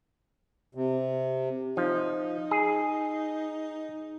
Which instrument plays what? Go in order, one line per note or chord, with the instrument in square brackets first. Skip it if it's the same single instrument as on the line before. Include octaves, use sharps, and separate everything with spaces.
[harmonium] C3
[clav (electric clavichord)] F3 [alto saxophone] D#4
[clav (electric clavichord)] G#4